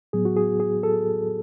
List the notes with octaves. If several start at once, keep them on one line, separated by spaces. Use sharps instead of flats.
A2 F#3 B3 G#4
F#4
G#4
G#4
A4